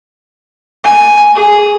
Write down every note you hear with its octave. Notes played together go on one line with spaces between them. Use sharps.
G#5
G#4